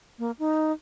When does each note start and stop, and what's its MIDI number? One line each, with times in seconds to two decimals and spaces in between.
0.19 0.31 58
0.39 0.72 63